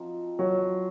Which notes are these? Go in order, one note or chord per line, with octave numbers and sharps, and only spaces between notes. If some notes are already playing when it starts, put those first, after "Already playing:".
Already playing: F3 C4 D#4 F#4
F#3